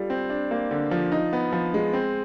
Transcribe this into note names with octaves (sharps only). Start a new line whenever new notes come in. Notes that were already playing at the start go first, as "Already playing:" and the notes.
Already playing: G3 F4 A4
C4
D4
A#3
D3
F3
D#4
B3
F3
G#3
C4